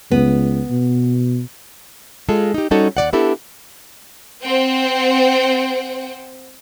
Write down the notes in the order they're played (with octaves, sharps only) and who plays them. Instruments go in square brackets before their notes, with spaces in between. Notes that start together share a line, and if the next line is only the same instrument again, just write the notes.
[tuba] C#2 [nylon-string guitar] B3
[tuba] B2
[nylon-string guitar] G#3 F4 G#4 A4
D#4 G4
G3 C#4 D#4 F#4 A4 C#5
D#2 E3 D5 F#5
B3 D4 E4 G4 A4
[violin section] C4 C5 F#5 G5